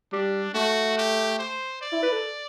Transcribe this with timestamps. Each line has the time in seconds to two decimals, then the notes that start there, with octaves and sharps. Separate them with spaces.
0.12 G3 D4
0.54 A3 F#4
0.97 G4
1.38 C5
1.81 D5
1.92 E4
2.02 B4
2.13 A4